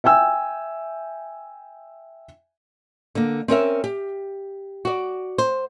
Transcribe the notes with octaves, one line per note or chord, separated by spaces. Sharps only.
E5 G5 G#5 E6
D3 A#3
C4 C#4 A#4 E5
G4
F#4 D5
C5